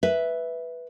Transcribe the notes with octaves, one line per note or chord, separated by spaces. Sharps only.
B4 E5